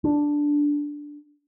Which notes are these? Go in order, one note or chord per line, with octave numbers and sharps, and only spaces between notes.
D4